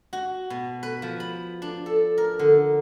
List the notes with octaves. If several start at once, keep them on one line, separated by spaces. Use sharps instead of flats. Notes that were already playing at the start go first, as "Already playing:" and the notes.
F#4
B2
B4
F3
B5
D4
A4
A#4
D3